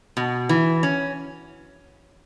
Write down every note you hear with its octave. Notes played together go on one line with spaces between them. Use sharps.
B2
E3
C#4